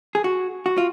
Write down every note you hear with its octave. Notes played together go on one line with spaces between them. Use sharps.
G#4
F#4
F#4
F4